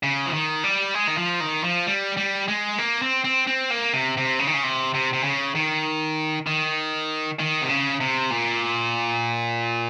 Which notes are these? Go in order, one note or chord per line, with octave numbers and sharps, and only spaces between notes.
C#3
F3
D#3
G3
G#3
D#3
F3
D#3
F3
G3
G3
G#3
A#3
C4
C4
C4
A#3
C3
C3
C#3
D#3
C#3
C3
C3
C3
C#3
D#3
D#3
D#3
C3
C#3
C3
A#2